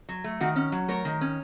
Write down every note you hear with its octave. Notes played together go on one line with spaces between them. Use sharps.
F#3
A3
D#3 F#4
C#4
F#3
A3 A#4 C#5
D#3
C#4